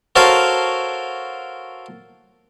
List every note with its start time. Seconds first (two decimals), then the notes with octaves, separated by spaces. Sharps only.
0.16 F#4 A4 A#4 C5 C#5 F5